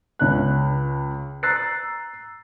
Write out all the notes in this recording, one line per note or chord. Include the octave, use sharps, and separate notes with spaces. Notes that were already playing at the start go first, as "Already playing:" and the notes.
C#2 C#5 F#6
A#5 E6 F#6 A6 C7